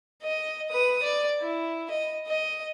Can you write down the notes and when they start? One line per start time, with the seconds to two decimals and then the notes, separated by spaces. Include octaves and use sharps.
0.23 D#5
0.70 B4 D#6
1.03 D5
1.41 E4
1.90 D#5
2.28 D#5